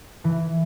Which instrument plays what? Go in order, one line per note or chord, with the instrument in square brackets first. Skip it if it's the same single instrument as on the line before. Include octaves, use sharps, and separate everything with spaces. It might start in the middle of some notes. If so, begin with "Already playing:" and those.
[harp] E3